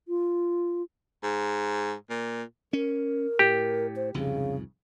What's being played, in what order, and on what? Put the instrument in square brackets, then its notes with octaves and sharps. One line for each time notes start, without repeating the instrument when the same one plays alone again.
[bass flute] F4
[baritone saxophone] G#2
A#2
[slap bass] C#4 [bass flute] A#4
[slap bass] A2 [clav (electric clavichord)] G4
[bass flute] C5
[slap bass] C2 F2 G#2 [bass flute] C#3